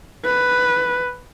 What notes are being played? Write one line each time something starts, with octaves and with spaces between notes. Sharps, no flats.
B4